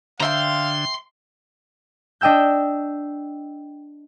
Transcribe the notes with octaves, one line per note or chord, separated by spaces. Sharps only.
D3 C5 E5 F5 G5 A#5 C6
D4 D#5 G5 E6 G6